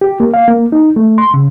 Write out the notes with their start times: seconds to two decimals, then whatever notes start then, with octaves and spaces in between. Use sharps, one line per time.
0.01 G4
0.20 A#3
0.34 F5
0.48 A#3
0.72 D#4
0.96 A3
1.18 C6
1.34 C#3